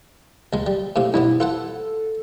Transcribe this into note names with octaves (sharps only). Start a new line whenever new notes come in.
C#2 G#3
G3
A2 C3 F5
G2 B2 B3 E4
F4 A4 B4 F#5